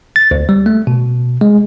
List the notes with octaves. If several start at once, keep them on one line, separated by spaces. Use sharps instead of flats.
A6
D2
G3
A3
B2
G#3